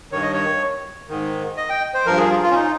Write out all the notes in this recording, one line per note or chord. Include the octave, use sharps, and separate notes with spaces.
G2 D#3 C#5
D#5
C#5
G#2 D#3
D#5
G5
C5
G2 F3 A#4
G#4
F4
F4
C#4
D#4